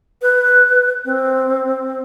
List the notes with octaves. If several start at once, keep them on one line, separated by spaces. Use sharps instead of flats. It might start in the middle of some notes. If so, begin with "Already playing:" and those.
B4
C4